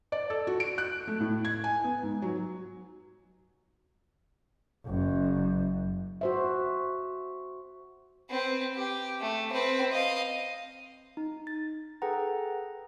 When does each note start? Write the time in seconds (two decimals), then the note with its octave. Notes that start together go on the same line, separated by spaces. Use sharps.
0.12 D5
0.30 A4
0.47 F#4
0.60 D7
0.78 F#6
1.07 A3
1.20 A2
1.45 G#6
1.64 G#5
1.84 B3
2.03 G#2
2.22 F#3
4.86 F#1 F#2
6.21 F#4 C5 E5
8.30 C4 B4
8.74 G4
9.21 A3
9.53 C4 B4
9.92 D#5 F5
11.17 D#4
11.47 A6
12.02 G#4 A4 B4 F#5 G5 A#5